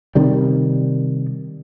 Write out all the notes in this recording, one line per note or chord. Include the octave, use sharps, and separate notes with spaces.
C3 D#3 G3